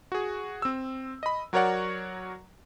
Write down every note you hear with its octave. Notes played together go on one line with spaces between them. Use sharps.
F#4 G#4
C4 E6
D#5 B5
F#3 F#4 A#4 C#5 D5 F#5